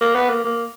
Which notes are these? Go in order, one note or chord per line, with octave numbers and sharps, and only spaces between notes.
A#3
B3
A#3
A#3